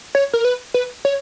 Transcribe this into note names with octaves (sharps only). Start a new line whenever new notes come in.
C#5
A#4
B4
B4
C#5